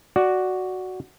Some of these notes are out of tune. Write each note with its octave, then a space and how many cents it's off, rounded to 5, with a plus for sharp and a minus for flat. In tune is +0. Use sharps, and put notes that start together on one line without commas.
F#4 +0 D5 +0